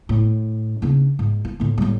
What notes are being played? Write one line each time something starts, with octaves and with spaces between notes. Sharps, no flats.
A2
C#3 D4
G#2
F4
A2 D3
A2 G3